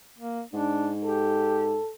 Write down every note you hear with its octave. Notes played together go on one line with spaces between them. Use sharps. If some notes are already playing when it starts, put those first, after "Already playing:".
A#3
G#2 D4
G4 A4